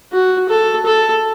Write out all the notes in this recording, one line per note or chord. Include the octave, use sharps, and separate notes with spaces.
F#4
A4
A4